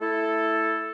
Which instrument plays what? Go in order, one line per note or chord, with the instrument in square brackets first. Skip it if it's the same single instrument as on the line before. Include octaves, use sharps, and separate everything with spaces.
[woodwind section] A3 E4 A4